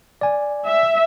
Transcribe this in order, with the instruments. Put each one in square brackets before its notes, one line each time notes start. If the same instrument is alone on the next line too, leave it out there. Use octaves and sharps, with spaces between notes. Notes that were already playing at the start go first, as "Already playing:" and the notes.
[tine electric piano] D5 G#5
[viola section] E5